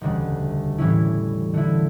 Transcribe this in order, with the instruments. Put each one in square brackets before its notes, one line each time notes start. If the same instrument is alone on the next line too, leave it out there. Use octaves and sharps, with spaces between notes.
[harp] E1 D2 C#3 G3
A2 E3 G3 C#4 E4
D3 A3 E4